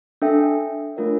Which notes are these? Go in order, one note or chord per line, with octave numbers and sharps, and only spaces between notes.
D4 A4 E5 G5
A3 D4 F4 A#4 C#5